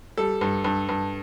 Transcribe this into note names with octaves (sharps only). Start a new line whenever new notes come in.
G3 A4
G2
G2
G2